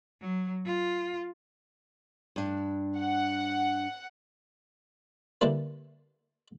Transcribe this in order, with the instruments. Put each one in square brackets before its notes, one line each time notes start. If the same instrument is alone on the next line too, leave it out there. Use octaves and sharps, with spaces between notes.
[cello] F#3
F4
[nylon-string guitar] G2 D4
[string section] F#5
[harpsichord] D3 G3 A#3 D4 E4 B4